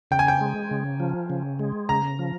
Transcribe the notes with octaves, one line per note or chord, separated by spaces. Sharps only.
C#3 G5
G#5
G5
G#3
C#3
F3
C#3
G#3
C#3 A#5
F3